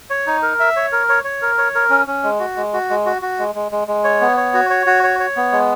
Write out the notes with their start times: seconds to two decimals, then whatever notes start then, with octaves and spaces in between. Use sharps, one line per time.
0.10 C#5
0.27 D#4
0.43 A#4
0.60 E5
0.76 C#5
0.92 A#4
1.09 C#5
1.24 C#5
1.42 A#4
1.58 C#5
1.75 A#4
1.90 C#4
2.07 C#4
2.23 G#3
2.40 F#4
2.56 G#3
2.73 F#4
2.90 G#3
3.06 F#4
3.22 F#4
3.39 G#3
3.55 G#3
3.72 G#3
3.88 G#3
4.04 C#5
4.21 B3
4.37 C#5
4.54 F#4
4.70 C#5
4.86 F#4
5.03 C#5
5.20 C#5
5.36 B3
5.52 G#3